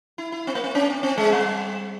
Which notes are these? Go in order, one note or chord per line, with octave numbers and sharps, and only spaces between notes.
E4
E4
C4
A#3
C4
C#4
C4
C4
G#3
G3